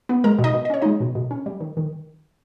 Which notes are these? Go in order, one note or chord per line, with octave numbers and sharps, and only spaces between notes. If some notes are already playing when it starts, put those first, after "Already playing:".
B3
G#3 A#4 A#5
B2
D#4 D#5
B2
D#5
C#4 C#5
G#3 D#4 D#5
B2
B2
C#4
G3
D#3
D#3